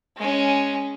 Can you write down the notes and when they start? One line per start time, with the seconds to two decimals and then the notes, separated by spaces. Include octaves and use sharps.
0.17 G#3 C#4